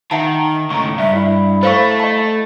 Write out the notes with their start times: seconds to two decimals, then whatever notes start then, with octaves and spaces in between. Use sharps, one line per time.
0.11 D#3 E5 F#5 A5
0.70 C#2 A2 A#5 C#6
0.98 G2 E5
1.15 E4
1.63 A3 C5 F5 C#6
2.00 D#5 A5